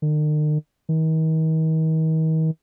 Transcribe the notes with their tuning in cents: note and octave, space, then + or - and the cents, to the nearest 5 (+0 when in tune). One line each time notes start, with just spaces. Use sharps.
D#3 -45
D#3 +40